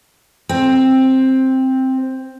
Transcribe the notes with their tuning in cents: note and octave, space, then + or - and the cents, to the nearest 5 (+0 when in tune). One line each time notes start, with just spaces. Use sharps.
C4 +5